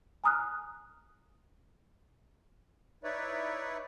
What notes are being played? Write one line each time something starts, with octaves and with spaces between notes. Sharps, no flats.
G#5 A#5 D#6 F6 F#6
D#4 E4 B4 C#5 D5 E5